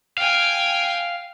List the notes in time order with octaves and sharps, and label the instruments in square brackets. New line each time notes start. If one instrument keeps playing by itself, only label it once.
[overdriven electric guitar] F5 [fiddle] G5 G#5